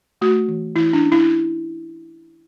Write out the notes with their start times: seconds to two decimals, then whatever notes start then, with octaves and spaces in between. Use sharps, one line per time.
0.21 A3 F#4
0.48 E3
0.76 E3 E4
0.93 D4
1.03 C#4
1.12 E4